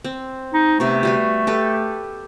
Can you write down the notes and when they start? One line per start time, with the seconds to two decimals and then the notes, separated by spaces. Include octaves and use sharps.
0.04 C4
0.54 D#4
0.80 C3 A3 B3
1.03 G3 F#4 B4
1.47 G4 A4 B4